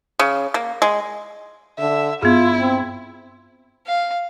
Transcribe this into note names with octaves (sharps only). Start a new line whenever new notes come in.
C#3
A#3
G#3
D3 E5
G2 B3 D4 E4 F4 G#4
C4
F5